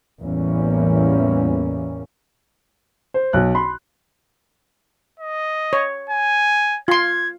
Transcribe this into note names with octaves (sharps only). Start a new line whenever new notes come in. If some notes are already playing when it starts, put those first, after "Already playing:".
A1 E2 E3 G3 A#3 C#4
C5
B1 F#6
B5 C6
D#5
C#5
G#5
F4 C6 G#6